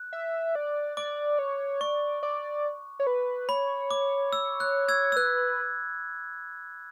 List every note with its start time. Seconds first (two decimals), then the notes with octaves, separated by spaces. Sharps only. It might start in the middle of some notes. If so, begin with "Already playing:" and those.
Already playing: F#6
0.13 E5
0.55 D5
0.97 D5 D6
1.39 C#5
1.81 D5 C#6
2.23 D5
3.00 C#5
3.07 B4
3.49 C#5 B5
3.91 D6
4.33 E6
4.60 F#6
4.88 E6 G#6
5.12 E6
5.16 B4 F#6